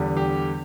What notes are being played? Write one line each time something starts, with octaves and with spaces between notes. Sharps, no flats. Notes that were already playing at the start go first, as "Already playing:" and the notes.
Already playing: E2 D3 G3
G4